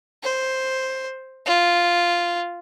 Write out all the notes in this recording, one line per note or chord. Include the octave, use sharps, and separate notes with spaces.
C5
F4